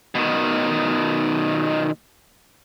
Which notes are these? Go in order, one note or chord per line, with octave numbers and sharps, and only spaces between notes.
B2 D#3